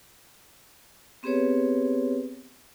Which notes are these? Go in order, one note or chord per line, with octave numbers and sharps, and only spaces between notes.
B3 C4 G4 G#4 B4 C#5